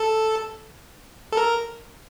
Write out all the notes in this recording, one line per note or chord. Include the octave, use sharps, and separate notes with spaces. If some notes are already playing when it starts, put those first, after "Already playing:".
Already playing: A4
A4
A#4